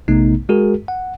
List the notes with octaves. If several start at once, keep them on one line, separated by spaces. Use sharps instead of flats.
A#1 C3 A3 B3 D#4
G#3 F#4 G#4 A#4
F#5